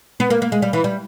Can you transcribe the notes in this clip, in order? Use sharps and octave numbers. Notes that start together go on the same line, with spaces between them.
B3
A#3
A#3
G#3
G3
E3
G3